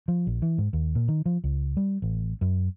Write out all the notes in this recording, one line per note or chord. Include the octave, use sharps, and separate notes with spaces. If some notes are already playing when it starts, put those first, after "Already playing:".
F3
A#1
E3
G#2
D#2
A#2
D#3
F3
C#2
G3
A1
F#2